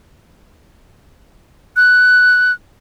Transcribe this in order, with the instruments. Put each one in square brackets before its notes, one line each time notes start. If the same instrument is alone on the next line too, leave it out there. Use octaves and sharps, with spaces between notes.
[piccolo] F#6